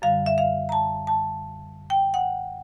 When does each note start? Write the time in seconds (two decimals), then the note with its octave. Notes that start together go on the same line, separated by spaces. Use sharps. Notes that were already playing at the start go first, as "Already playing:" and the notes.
0.02 F#2 D3 G3 F5
0.26 E5
0.38 F5
0.69 A#5
0.72 A5
1.07 A5
1.90 G5
2.14 F#5